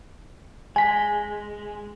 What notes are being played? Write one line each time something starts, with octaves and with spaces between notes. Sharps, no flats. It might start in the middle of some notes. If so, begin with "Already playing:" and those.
G#3 G#5 B6